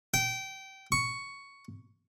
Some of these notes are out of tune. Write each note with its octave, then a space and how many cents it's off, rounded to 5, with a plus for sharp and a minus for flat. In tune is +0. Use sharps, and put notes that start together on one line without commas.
G5 -20
C#6 +5